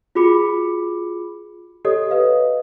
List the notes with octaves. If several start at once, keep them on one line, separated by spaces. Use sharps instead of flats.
F4 F#4 G#4 B5 D6 C#7
G4 A4 C#5 D#5 D#6
B4 D#5 F5